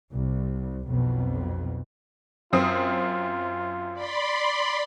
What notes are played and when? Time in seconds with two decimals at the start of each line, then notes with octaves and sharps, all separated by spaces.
0.11 C2
0.87 B1 F2 B2
2.53 F#2 C4 F4 D#6
3.93 D5 B5 C6